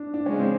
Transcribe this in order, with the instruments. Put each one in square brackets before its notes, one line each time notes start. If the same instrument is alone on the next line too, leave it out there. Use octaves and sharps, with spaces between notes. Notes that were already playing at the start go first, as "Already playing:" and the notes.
Already playing: [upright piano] D4
D4
[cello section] C#3 F3 G#3 [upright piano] C#4
[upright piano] C4